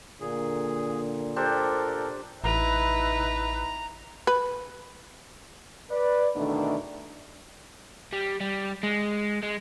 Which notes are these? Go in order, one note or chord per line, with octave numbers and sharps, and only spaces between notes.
A#2 D3 A#3 G#4
D4 G4 A4 A#4 C5
A1 D#4 E4 B4 A#5
B4
B4 D5
E2 B2 D3 D#3 A3 D4
G3
G3
G#3
G#3